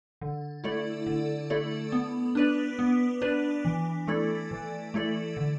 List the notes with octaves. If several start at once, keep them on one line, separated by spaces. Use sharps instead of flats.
D3
A3 E4 A4 D5
D3
A3 E4 A4 D5
B3
D4 B4 D5
B3
D4 B4 D5
E3
A3 E4 A4 D5
E3
A3 E4 A4 D5
D3